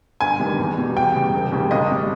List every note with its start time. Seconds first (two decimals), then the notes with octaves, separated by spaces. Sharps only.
0.21 G1 G#5
0.40 G2 D#3 G3
0.59 E2
0.77 B2 G3
0.96 E2 G5
1.15 C#3 G3
1.34 E1
1.52 D#2 C#3 G3
1.71 G#1 D#5
1.92 G3